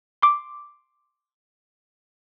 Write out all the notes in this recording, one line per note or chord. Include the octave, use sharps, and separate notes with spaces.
C6 D6